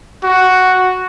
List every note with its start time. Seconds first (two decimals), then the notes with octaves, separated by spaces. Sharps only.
0.24 F#4